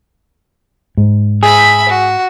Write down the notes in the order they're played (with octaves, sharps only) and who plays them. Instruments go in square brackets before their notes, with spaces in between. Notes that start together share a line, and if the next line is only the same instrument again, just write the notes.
[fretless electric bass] G#2
[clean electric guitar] G#4 [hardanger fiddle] E5 B5
[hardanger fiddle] F#4